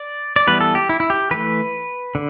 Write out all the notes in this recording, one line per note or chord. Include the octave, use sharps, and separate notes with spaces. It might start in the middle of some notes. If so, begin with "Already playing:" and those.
Already playing: D5
D5
E3 G3 B3 B4
A4
G4
E4
E4
G4
E3 A3 B4
D3